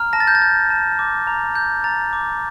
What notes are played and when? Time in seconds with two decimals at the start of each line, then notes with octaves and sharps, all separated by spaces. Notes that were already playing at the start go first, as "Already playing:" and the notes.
Already playing: A#5 F6
0.13 A5 A#6
0.20 A6
0.27 G6
0.35 A6
0.42 G6
0.70 A5
0.99 D6
1.27 A#5
1.55 G6
1.84 A#5 A6
2.13 D6